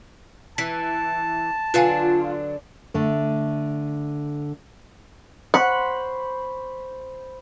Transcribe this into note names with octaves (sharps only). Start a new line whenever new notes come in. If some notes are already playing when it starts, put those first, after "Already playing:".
E3 A5 B6
D3 F#3 D4 F4 B4 F5 G#5
D3 A3
C5 F#5 B5 C#6